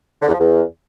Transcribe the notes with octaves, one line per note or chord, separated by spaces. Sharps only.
D3
E2
F3
E2